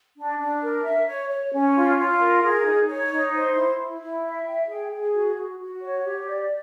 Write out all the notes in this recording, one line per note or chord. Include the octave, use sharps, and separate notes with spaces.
D4
D4
A#4
E5
C#5
C#5
C#4
F4
F4
A#4
G#4
D#4
C#5
D#4
C5
E4
E4
E4
E5
G5
G#4
G#4
F#4
F#4
F#4
C#5
G4
D5